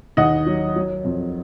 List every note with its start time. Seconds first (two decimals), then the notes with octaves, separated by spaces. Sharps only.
0.17 D#2 D#5 F#5
0.46 F#3
0.76 F#3
1.05 F2